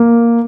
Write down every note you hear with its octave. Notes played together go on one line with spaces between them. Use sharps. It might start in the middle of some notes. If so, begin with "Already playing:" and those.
Already playing: A#3